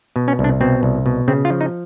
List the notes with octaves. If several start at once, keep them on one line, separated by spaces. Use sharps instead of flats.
B2
C#4
C2
D4
B2 C4
C2
B2
C#3 C4
F4
F3
D#4